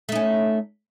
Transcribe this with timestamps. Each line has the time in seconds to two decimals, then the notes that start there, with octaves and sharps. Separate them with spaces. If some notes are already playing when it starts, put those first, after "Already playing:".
0.09 A3
0.12 D#4
0.15 C#4